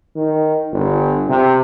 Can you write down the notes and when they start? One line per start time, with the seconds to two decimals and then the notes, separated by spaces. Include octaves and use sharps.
0.16 D#3
0.72 G1
1.29 C3